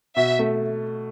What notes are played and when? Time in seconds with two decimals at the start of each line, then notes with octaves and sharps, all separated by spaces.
0.16 B2 E5
0.39 A3